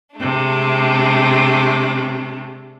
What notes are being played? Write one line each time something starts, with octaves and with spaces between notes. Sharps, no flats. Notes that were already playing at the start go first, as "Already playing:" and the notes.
C3 G#3 A3 D4